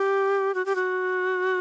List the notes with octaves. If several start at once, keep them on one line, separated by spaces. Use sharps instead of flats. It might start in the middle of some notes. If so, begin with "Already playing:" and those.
Already playing: G4
F#4
G4
F#4